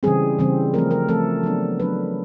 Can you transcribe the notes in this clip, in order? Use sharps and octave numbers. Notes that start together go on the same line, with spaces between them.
C#3 E3 G3 C4 G#4
C#3 E3 G3 C4
F3 A3 C4 A#4
A#4
F3 A3 C4 A4
F#3 B3 D4
F#3 B3 D4 B4